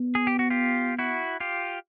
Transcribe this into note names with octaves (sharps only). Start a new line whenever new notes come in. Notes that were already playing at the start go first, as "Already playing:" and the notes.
Already playing: B3
G#4
G4
F#4
F4 G4
E4 F#4
F4 G4